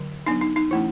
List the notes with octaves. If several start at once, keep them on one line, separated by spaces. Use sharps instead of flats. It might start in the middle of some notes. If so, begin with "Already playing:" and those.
Already playing: D3 F#3
F#3 B3 D4 D#4
D#4
D#4
E3 A3 C#4 E4